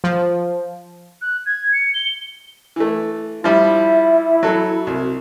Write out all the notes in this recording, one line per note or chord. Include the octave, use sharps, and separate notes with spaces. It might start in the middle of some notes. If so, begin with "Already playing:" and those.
F3
F#6
G#6
C#7
G7
E3 A3
F3 G3 E4 E5
F#3 F#4 A4
C2